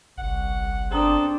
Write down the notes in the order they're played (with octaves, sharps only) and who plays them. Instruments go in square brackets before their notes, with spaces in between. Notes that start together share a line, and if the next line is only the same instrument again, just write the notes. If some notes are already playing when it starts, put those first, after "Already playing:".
[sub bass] G1 [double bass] C2 [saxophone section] F#5
[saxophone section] B3 G#4 A4 [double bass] C4 D4 [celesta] C5 A#5 D#6